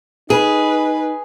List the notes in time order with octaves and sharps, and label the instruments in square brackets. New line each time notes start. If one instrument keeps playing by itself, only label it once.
[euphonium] D#4 [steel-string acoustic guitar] G#4 [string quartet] B4